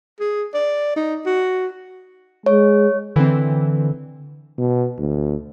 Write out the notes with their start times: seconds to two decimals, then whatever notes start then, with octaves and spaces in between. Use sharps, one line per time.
0.20 G#4
0.54 D5
0.96 D#4
1.26 F#4
2.46 G#3 C#5
3.16 D3 E3 C4
4.58 B2
4.98 D2